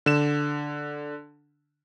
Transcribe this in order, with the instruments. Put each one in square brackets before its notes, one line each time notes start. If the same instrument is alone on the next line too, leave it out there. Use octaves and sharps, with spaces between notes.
[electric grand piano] D3 E7